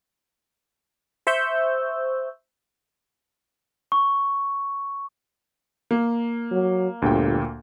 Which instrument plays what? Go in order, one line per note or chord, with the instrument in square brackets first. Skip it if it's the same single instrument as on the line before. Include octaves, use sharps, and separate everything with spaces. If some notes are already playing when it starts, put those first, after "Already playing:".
[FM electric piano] C5 E5 C#6 E6 G6
[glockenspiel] C#6
[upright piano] A#3
[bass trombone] F#3
[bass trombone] G1 [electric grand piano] D2 A#2 G5